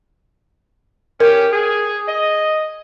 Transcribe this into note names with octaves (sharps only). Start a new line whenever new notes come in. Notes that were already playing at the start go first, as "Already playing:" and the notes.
C#4 G4 A#4
G#4
D#5